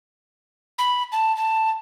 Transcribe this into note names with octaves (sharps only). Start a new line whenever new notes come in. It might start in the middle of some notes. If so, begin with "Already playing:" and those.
B5
A5
A5